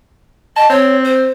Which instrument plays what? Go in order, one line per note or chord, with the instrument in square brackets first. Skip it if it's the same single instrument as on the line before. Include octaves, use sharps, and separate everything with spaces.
[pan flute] D#5 [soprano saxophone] A5
[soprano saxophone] C4 [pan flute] C#5
[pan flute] C5